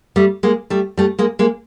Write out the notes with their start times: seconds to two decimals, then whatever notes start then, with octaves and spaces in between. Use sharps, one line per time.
0.16 G3 A3
0.43 G#3 A#3
0.70 G3 A3
0.97 G3 A3
1.19 G#3 A#3
1.39 G#3 A#3